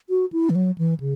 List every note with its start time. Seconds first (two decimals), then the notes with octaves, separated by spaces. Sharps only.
0.09 F#4
0.32 E4
0.50 E3
0.55 F#3
0.78 E3
1.00 C#3